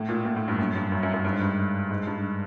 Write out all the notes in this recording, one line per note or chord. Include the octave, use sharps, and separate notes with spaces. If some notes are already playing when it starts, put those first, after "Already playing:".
Already playing: A2
A#2
A#2
A2
G2
F#2
G2
F#2
F#2
F#2
G2
G#2
G2
G#2
G2